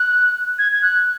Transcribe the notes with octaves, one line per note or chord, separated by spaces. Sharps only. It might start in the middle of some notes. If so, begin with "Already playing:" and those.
Already playing: F#6
G#6
G#6
F#6